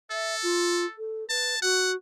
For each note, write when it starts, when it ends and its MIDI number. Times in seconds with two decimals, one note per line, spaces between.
0.11 0.96 69
0.11 0.35 76
0.43 0.86 65
0.98 1.28 69
1.30 1.55 71
1.30 1.60 81
1.62 1.95 66
1.62 1.92 78